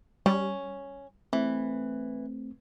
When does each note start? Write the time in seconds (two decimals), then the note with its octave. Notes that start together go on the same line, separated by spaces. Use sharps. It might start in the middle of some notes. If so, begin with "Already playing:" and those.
0.26 G3 C#4
1.33 E3 A3 C4